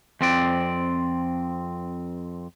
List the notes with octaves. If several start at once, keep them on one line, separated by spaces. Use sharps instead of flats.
F2 C4 D5